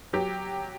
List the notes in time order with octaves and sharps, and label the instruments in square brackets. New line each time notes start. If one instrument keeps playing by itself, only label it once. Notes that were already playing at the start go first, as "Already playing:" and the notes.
[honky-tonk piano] F#3 G4